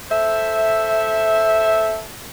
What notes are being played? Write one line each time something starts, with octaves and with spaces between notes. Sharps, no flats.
A4 C5 E5